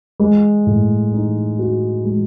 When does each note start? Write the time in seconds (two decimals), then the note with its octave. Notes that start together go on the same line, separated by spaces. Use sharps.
0.20 G#3
0.66 A2
1.13 D#4
1.59 F#4
2.05 G#3